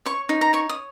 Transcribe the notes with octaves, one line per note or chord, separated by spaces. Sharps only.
C#5 C#6
D#4
A#5
C#5 C#6
D#6